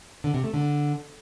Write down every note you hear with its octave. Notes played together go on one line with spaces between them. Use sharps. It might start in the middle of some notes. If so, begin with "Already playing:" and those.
D3
C3
A3
D3